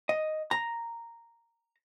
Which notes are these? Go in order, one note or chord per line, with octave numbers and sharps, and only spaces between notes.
D#5
A#5